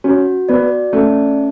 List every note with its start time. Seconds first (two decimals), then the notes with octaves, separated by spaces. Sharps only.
0.04 C#4 F#4
0.49 B3 D5
0.93 A3 C#4